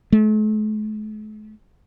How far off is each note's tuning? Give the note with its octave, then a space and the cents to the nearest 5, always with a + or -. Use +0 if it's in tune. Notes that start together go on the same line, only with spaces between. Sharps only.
A3 -45